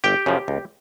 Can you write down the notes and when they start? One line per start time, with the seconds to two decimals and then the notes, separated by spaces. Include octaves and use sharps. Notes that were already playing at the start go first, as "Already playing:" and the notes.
0.04 G1 G4 G5
0.26 F#2 C#3 F3
0.48 C#2